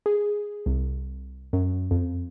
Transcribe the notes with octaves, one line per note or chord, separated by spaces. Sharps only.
G#4
C2
F#2
F2